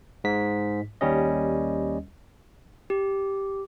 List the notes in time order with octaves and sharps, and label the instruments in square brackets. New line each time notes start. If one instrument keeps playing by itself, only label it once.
[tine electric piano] G#2 B6
D#2 G3 C#4 D#5
[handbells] G4